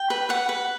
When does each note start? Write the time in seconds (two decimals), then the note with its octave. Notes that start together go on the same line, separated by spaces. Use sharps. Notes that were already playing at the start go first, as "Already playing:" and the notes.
Already playing: G5
0.10 B4
0.29 B4 F#5
0.49 B4